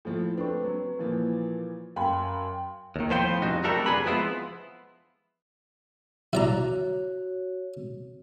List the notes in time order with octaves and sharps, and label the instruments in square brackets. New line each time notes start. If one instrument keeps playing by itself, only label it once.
[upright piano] A2 F3
[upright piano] A3 C4 D4 [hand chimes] B4 C#6
[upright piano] F#3
A#2 E3 F3
[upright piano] F#2 G#5 B5 [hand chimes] F5 G5 C6
[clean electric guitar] D#2 D#3
A2 F3 B3 C5 F5 G5
C2 F2 C#3 D#4 F#4
F#3 G3 A3 F#4 A4 A#4
F2 C3 D4 G#4 B4 B5
F3 G#3 B3 E4 F4
[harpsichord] E4 D5 A#5 [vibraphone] F#4 C#5